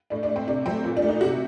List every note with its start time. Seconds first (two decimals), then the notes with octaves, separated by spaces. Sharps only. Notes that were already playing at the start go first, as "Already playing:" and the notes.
0.10 A2 D4
0.23 D4
0.29 A3
0.36 C4
0.47 C3 D4
0.66 F#3 A3 C4
0.84 A#2
0.97 D4
1.02 A3
1.09 D#4
1.21 C3 F#4